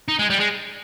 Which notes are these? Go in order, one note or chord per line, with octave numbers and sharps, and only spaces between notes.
D#4
G#3
G3
G#3